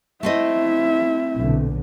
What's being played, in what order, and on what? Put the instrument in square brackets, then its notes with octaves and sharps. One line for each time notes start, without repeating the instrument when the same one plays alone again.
[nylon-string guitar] A3 C4 D#5 [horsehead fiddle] E4 E5
[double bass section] B1 A#2 D3